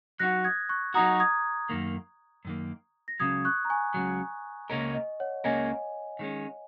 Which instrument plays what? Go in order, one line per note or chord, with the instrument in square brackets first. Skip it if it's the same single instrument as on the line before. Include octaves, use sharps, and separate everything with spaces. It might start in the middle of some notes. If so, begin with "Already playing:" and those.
[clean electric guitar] F#3 D#4 F#4 [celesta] F#6 A#6
[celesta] D#6 G#6
C#6 F#6
[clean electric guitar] F#3 D#4 F#4 [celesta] A#5 D#6
[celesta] D#6 G#6
[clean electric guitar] F#2 D#3 A#3
F#2 D#3 A#3
[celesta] A#6
[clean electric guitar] C#2 C#3 F#3 [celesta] D#6 G#6
[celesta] C#6 F#6
A#5
G#5 C#6
[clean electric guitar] C#2 C#3 F#3
[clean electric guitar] C#2 C#3 A#3 C#4 A#4 [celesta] D#5
[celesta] D#5
C#5 F#5
[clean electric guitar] C#2 C#3 A#3 C#4 A#4 [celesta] D#5 G#5
[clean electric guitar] D#3 G#3 C#4